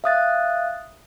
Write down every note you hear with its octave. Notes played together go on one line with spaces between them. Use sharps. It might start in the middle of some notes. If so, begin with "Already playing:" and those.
E5 F5 D#6 F#6 A6